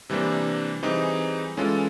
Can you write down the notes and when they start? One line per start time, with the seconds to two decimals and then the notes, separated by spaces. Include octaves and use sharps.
0.10 C3 E3 G3 A#3 D4
0.83 E3 G3 C4 D#4 G#4
1.57 E3 G#3 C#4 F4 A4